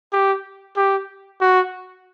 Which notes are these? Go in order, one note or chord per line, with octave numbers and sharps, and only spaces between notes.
G4
G4
F#4